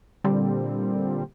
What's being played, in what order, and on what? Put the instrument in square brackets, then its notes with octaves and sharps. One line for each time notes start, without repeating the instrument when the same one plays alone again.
[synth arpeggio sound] A#2 D3 G3 C4